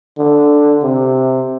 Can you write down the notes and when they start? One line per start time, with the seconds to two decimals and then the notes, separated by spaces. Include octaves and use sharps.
0.19 D3
0.83 C3